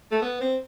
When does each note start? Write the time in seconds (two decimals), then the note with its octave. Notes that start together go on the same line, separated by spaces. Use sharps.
0.11 A3
0.22 B3
0.41 C4